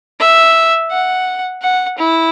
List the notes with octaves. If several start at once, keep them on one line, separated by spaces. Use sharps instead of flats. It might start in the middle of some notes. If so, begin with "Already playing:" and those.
E5
F#5
F#5
E4